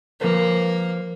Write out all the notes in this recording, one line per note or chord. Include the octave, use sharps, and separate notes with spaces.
F3 A#3 B4 C5